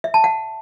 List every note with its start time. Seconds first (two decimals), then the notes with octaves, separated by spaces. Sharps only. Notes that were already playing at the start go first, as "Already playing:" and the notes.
0.04 E5
0.14 A5
0.24 F#5